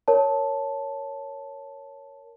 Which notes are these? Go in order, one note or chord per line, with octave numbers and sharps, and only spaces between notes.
A#4 C#5 A5